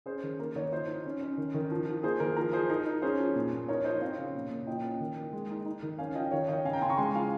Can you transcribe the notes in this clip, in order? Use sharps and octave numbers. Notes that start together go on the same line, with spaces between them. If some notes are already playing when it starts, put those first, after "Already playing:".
C#4 G#4 C5
D#3 G#4
A#3 A#4
D#3 A#4 C#5
F3 C5 D#5
D#4
C#4
C#4
D#3
D#3
F3
F3
A#3 G#4 C5
D#3 A#4
F3 A#4
F3 G#4 C5
D#4 A#4
D#4
C#4 G#4 C5
F3
A#2
A#2
D#4 A#4 C#5
F3 C5 D#5
C4 C#5 F5
C#3
A#2
A#2
F3 D#5 G5
C#4
D#3
A#3
G#3
D#4
D#4
D#3
C#4 F5 G#5
F3 D#5 G5
D#3 C#5 F5
D#3 D#5 G5
C#3 F5 G#5
G5 A#5
C#3 G#5 C6
A#5 C#6
G#3 G#5 C6
F3 F5 G#5